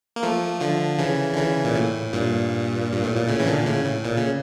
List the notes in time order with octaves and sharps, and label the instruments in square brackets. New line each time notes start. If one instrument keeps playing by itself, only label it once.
[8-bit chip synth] A#3
F3 A3
D3 F3
C#3 E3
D3
C#3 E3
A#2
A2
G2 A#2
G2
A2
A#2
A2 C#3
E3
A#2 D3
A2 C#3
A2
A#2
C#3